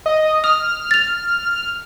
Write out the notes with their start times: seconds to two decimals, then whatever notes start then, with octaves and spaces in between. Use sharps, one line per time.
0.06 D#5
0.44 D#6 F6
0.91 A6 F7